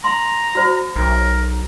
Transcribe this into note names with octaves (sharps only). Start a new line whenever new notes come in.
A#5 C6
F#4 C5
B1 A#4